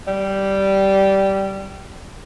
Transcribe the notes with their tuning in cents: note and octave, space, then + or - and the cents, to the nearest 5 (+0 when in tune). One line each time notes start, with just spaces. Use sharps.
G3 -10